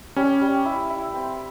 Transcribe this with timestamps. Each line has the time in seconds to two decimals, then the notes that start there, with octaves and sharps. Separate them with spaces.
0.16 G3 C#4
0.41 G3
0.65 E4
0.90 E4
1.14 C4